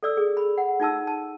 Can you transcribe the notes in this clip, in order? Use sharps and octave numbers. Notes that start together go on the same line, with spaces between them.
A4 D5 E6
G#4
B5
F#5
D#4 F4 A5 E6
A5